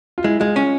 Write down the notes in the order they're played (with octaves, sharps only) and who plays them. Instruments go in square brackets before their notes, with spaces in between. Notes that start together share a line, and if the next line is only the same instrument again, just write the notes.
[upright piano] F4
[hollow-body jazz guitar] G#3 [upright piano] E4
[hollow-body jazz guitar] G#3 [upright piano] F4
[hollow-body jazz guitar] C#4